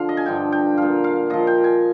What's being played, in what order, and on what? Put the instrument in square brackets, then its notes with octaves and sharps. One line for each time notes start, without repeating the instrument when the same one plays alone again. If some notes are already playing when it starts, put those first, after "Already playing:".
Already playing: [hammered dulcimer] D3 F3 F5
D#5
G#5
G2 D3 F3 G5
G5
A#2 F3 F5
F5
A#2 F3 D#5
G5
G#5